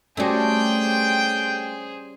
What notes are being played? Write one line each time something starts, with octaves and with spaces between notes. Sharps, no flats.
G3 A3 C#4 F#4 G#4 C5 D5 G5